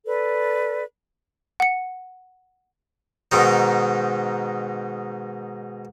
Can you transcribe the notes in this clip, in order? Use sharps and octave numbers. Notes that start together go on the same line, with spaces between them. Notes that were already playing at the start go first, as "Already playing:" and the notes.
A4 B4 D5
F#5 C#7
G#2 B2 D#3 D#4